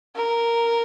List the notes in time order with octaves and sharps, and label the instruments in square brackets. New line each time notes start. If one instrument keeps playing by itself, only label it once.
[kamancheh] A#4